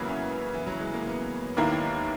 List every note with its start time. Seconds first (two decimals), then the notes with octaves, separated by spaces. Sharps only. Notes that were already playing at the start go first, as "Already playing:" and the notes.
Already playing: C#3 E3 F#3 G#3 A#3 B3 E4
0.09 C#4
0.54 E3
0.66 F#3
0.80 G#3
0.94 A#3
1.07 B3
1.57 D#2 D#3 A#3 E4